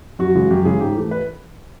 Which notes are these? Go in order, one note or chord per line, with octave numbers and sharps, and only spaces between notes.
F#2 F#4
C#3 E3 G#3
F#2 G4
C#3 E3 G#3 G#4
G#2 G4
E3 A3
B4